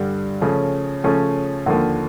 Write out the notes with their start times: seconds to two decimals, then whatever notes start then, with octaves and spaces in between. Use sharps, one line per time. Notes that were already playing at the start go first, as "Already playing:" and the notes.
Already playing: G2 D3 G3
0.41 C#3 F3 A3 C#4
1.04 C#3 F3 A3 C#4
1.66 D#2 D3 F3 A#3